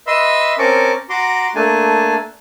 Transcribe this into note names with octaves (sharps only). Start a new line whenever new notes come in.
B4 D#5 E5 C6 E6
C4 C#4 A#4 A5 C#6 D6
F#4 A#5 C6 D6
A3 A#3 D4 G#5 A5